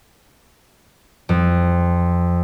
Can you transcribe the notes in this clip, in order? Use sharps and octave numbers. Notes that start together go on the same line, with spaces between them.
F2